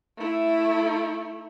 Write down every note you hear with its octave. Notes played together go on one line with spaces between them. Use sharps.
A3 E4